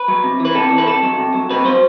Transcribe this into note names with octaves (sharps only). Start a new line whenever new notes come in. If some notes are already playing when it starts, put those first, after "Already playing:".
Already playing: B4
F#3
C3
E3
B4
C3 A4
E3
B4
C3 A4
F#3
C3
F#3
C3 B4
F#3 C5